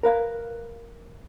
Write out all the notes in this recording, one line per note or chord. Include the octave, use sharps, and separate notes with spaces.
A#4 B4 F5